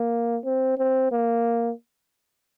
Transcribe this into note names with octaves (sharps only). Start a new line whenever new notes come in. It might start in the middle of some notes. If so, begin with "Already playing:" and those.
Already playing: A#3
C4
C4
A#3